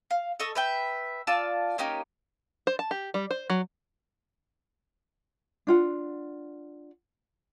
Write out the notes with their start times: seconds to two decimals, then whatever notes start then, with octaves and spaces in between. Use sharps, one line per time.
0.11 F5
0.40 A4 D#5 C#6 E6
0.55 B4 E5 G5
1.27 F4 D5 A5 E6
1.78 A#3 C#4 D#4 G4
2.67 C5
2.79 A5
2.91 G4
3.14 G3
3.31 C5
3.50 F#3
5.67 D4 F4 F#5